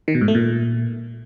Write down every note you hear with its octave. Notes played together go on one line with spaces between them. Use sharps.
D#3
B2
G#2
A3
A#2